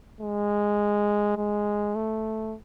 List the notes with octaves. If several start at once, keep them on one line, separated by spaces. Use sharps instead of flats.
G#3
G#3
A3